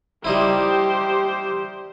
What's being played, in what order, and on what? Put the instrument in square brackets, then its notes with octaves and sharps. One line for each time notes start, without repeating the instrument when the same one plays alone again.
[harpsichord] G3 D#4 E4 [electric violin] G4 C5